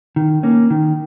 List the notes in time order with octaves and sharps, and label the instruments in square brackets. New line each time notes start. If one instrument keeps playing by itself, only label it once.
[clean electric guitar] D#3
A#3 C#4
D#3